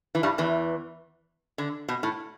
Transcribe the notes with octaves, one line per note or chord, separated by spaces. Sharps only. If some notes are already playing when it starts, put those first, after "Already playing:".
E3
G2 G3
E2 E3
D3
B2
A2